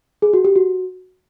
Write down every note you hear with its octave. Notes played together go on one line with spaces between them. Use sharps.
G#4
F#4
G4
F#4